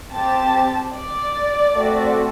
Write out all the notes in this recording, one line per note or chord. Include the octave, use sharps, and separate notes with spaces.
C4 G4 A5
D5
A3 C4 F#4 A4